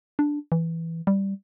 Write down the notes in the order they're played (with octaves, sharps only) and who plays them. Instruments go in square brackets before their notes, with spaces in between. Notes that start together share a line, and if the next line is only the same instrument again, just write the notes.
[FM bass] D4
E3
G3